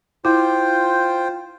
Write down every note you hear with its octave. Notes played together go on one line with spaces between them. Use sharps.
E4 F4 C5 G5